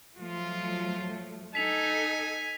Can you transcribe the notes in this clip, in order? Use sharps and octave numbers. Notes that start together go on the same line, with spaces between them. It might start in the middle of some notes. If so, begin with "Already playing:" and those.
F3 F#3 A3 F4
D#4 A4 G#5 B6 F7